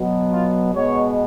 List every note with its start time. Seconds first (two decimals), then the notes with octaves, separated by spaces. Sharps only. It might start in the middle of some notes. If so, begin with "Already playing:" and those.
Already playing: B2 F#3 B3
0.30 F4
0.73 B2 G#3 B3 C#5